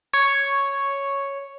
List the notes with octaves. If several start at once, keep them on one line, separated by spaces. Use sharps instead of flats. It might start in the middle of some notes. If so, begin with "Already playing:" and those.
C#5